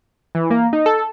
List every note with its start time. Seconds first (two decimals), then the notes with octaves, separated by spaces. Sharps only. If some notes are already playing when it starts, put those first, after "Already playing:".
0.35 E3
0.50 A#3
0.73 D#4
0.86 A4